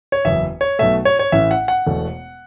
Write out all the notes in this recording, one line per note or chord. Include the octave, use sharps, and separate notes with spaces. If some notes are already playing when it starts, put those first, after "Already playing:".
C#5
F#1 E2 E3 E5
C#5
B1 B2 A3 E5
C#5
C#5
A1 A2 E3 C#4 E5
F#5
F#5
E1 E2 B2 A3